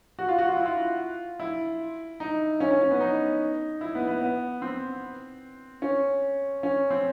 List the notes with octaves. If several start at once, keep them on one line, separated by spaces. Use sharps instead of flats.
F#4
F4
F#4
F4
E4
F4
E4
D#4
C#4
C#4
C#4
B3
D#4
E4
B3
B3
B3
C4
C#4
C#4
C4